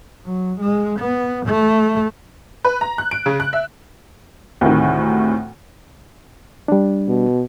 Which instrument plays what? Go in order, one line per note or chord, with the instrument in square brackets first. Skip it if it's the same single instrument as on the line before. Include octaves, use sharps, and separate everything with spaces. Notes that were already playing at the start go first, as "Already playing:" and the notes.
[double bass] F#3
G#3
B3
A3
[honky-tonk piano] B4
A#5
F#6
D7
C#3
F#6
E5
D2 A2 C3 D#3
[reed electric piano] G3 D4
[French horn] B2